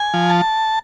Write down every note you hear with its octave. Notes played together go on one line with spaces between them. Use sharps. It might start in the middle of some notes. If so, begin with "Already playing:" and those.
Already playing: G#5
F3
A5